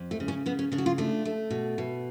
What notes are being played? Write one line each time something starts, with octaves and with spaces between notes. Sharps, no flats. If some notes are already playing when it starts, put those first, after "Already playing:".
Already playing: F2
A3
C#3
C#4
C#3 B3
C#4
C#3 D4
F#4
F4
A3 D4
A3
B2
B2